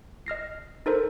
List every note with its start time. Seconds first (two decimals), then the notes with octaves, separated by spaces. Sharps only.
0.26 D#5 F6 A#6 C7
0.86 D#4 A4 A#4 C5